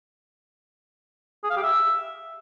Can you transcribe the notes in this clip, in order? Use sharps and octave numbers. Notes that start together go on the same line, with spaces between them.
G#4
F5
G4
E5